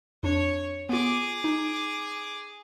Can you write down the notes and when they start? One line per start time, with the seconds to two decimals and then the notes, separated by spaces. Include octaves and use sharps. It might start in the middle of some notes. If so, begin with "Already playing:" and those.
0.23 F2 D4 C#5
0.89 B3 F4 G#4 D6
1.44 D#4